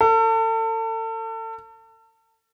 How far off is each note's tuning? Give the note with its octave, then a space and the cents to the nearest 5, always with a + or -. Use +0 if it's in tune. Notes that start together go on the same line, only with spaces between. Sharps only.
A4 +35